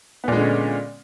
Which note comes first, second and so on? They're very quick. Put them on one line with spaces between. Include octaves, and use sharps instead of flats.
B3 A#2 G#3 D3 C#4